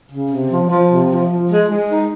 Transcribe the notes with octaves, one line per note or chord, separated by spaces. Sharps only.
C#3
C3
F3
F3
C3
F3
F3
G#3
G#3
D#4